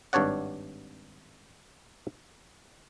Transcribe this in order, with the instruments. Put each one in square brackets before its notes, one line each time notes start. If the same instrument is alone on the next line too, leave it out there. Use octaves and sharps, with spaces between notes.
[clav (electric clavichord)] G#1 G2 D4 C#5 D5 F#5